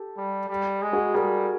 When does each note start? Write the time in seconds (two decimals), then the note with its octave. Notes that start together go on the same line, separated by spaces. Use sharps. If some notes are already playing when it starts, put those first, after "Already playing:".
Already playing: G4 A4
0.17 G3
0.49 G3
0.82 G#3
0.93 F#4 G#4
1.14 G3 G#4 A#4